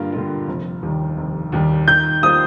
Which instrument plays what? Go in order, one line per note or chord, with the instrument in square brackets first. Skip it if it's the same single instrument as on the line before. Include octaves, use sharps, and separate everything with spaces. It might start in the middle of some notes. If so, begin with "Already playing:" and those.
Already playing: [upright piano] G2 D3 G3 A#3 F4
D3 G3 A#3 F4
F1
D#2 D#3 G3
F1
D#2 D#3 G3
[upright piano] D#3 [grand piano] G6
[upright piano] G3 A#3 F4 C5 [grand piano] D#6